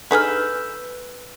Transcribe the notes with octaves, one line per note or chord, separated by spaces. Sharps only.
D4 D#4 G#4 A4 B4 E6 F6 G6